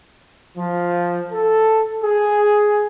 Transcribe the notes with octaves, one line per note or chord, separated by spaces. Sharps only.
F3
A4
G#4